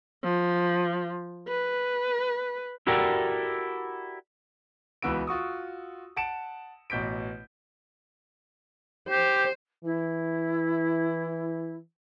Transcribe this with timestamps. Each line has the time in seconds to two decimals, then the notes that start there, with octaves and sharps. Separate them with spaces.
0.24 F3
1.48 B4
2.87 E4 F#4 G4 A4 A#4 D5
5.02 C#2 E3 B3 F#4 E6 D7
5.27 F4 F#4 C#6 D#6
6.16 F#5 A5 C#7 D7 E7
6.90 A1 B2 G6 B6 D7
9.09 G4 C5
9.84 E3 E4